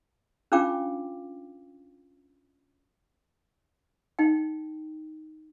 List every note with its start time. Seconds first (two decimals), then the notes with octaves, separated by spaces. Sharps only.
0.52 C#4 D4 F4 F5 G5 D6
4.19 D#4 G5